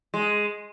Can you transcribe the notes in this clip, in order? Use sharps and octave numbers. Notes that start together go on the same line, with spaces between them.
G#3